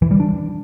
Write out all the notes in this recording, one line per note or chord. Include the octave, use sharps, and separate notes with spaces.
E3
G3
D4